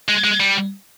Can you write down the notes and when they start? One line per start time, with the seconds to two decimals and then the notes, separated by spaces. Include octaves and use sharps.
0.09 G#3
0.24 G#3
0.40 G3